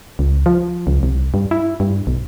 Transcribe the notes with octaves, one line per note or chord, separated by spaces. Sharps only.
C#2
F3
C#2
C2
G2
E4
G2
B1